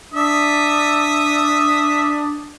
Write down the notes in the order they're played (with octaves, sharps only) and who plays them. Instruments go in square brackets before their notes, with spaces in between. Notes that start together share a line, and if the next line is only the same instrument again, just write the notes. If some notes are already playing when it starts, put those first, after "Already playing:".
[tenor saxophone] D4 [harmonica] E5 [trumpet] D#6